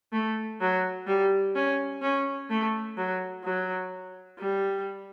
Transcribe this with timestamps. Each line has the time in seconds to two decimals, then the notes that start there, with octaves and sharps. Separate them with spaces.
0.13 A3
0.61 F#3
1.07 G3
1.55 C#4
2.02 C#4
2.50 A3
2.97 F#3
3.44 F#3
4.39 G3